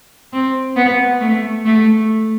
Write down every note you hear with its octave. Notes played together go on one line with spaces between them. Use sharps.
C4
B3
A3
A3